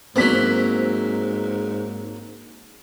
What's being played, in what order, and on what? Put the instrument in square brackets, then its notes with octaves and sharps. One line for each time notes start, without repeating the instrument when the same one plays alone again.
[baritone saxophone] G#2 [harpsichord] F#3 A#3 [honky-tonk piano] C4 B6